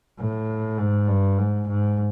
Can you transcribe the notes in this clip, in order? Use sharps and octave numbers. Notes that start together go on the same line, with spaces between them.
A2
G#2
G2
G#2
G#2